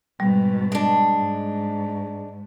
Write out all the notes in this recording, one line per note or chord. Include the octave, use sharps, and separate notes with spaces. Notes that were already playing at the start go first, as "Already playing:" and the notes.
G#2 B2 G3
G#3 D4
G#2